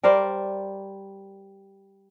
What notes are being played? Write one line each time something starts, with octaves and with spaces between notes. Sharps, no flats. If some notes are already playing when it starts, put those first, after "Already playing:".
G3 A#4 C5 D5